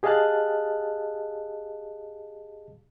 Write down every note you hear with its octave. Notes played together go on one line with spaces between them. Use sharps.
G4 G#4 D#5 F5 A5 F#6